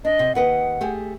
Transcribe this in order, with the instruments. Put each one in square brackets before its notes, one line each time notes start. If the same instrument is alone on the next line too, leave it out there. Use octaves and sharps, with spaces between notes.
[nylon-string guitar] D4 [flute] D#5
[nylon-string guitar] C3
[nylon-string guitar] D#2 B4 D#5 [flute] F#5
[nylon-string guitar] A3 G4 G#4